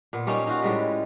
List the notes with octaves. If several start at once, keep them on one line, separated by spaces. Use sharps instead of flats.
A#2 B3
G3 A#3 C#4 D#4
D#4 F4 F#4
A2 G3 G#3 B4